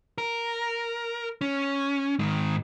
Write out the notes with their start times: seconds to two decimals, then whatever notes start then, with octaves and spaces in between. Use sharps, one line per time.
0.18 A#4
1.41 C#4
2.19 G#2 D#3